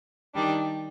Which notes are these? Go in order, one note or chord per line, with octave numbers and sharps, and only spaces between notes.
D#3 G3 D4